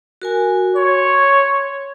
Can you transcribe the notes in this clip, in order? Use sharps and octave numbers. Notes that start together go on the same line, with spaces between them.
F#4 A#4 G#5
C#5 C6